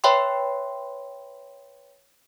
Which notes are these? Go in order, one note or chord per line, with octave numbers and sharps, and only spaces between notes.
B4 C#5 E5 G5 B5 C6